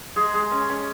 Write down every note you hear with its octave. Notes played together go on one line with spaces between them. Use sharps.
G#3 G#4
G#3
C#4
C#4